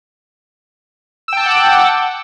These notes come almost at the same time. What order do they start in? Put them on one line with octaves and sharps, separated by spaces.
E6 G5 A5 D6 F#5